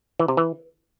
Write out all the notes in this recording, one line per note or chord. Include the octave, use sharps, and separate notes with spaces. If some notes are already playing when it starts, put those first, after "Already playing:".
E3
C3
E3